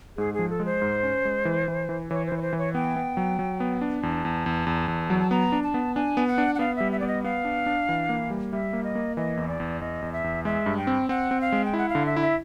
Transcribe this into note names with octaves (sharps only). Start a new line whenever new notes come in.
G#2 G#4
F3 G#4
A4
G#3
C5
G#2
C#4
G#3
E3
E3
E3
E3 C#5
C5
E3
C#5
C5
E3
C#5
B3 G5
B3
F#3
F#3
B3
D4
E2 A5
E2
E2
E2
E2
F#3
A5
B3 A#5
D4
A5
B3
D4 G#5
B3
F#5
D4
F#5
B3 F5
G3 E5
E5
D5
B3
D#5
B3 F5
D4
D4
E3
A#3
G3
G3 E5
A#3
D#5
A#3
E3 D#5
E2
D5
E2
E2 D#5
E2
E5
E2
G#3 E5
G2
G5
C4
C4 F#5
C4
F5
G#3
G5
E4 F#5
F5
D3
E5
E4 E5